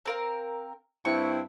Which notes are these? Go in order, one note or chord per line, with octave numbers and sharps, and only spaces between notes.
C4 A#4 F5
G2 C4 E4 C#6